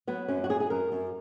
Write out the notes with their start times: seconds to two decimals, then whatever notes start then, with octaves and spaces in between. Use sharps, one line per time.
0.07 F#3 B3
0.28 F#2 C#4
0.44 F#4
0.50 F#2 G#4
0.60 G#4
0.70 F#2 A#4
0.92 F#2